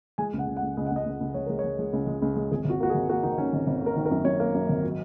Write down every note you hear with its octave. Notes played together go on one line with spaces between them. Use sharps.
G#3 G#5
C#2
F#5
C#2
F#5
C#2
C#2 D#5
F#5
C#2 D#5
C#2
C#2
G#3 C#5
G#3 A#4
C#5
G#3
G#3
C#2
G#3
C#2
G#3
G#1 G#4
G#1 F#4
A#3 F#4
G#4
G#1
A#3 F#4
D#3 D#4
D#3 C#4
G#1
G#1
A#3
A#4
D#3
A#4
F#2
F#2 C#5
A#3
F#2
G#1
F#3